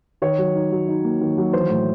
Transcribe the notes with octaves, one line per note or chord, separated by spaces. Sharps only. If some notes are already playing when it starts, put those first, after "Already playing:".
D#3 C#5
F#3
D#4
F#3
D#4
A#3
D#3
F#3
E3 C5
A2